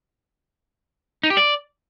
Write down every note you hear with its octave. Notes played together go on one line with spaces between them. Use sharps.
D#4
G4
D5